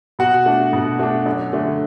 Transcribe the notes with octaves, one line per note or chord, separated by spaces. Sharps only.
B2 F#4 F#5
A3 D4
B2
A3 D4
F#2
D3 A3 D4